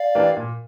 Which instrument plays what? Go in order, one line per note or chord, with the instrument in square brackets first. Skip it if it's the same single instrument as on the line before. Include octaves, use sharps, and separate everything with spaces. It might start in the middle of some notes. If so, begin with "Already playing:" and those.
Already playing: [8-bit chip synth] D5 F5
[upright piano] E3 A#3 D4 G4
A#2